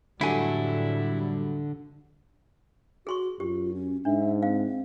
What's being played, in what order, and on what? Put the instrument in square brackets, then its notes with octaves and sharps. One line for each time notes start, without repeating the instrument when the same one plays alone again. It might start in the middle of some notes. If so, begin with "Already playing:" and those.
[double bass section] F2 A2 G3 [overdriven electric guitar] D3 [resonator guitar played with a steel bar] F#3 A3 [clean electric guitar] E4 G#5
[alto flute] F#4 [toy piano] G#4 C6 C#6
[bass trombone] F#2 [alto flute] F4 [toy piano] G4
[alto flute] C#4
[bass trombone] G#2 [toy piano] D4 [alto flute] E5
[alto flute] C4 [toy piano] F5